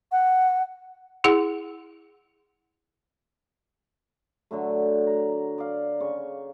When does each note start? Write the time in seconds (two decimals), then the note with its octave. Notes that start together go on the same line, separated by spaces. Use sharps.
0.12 F#5
1.24 E4 G#4 F#5
4.51 D3 F#3 A3
5.07 A#5
5.58 D5 F5
6.00 C#3 C#6